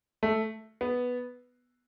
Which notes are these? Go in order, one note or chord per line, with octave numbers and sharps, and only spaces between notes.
A3
B3